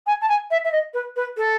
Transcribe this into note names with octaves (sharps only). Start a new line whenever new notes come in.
G#5
A5
G#5
E5
E5
D#5
B4
B4
A4